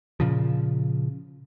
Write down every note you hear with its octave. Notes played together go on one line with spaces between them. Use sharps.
A#2 C#3 F3